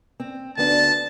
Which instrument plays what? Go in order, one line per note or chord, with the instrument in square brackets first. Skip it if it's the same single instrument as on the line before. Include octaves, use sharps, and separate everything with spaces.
[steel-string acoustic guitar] C4
[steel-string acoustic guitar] D2 B3 D4 [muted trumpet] A5